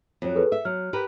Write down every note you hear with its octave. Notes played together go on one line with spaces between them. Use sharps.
F2 F#3
G#4 A4 B4
E5 E6
F#3 F6
G4 A#4 B4